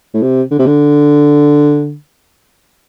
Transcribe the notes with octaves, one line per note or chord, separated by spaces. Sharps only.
A2
C3
D3
C3
D3